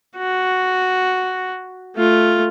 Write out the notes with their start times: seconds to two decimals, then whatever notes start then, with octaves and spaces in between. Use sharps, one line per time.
0.17 F#4
1.96 A3 F4